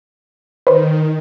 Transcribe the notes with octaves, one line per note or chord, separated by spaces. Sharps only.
D#3 B4 C5